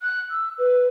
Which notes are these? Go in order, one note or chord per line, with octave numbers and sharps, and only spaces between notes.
F#6
E6
B4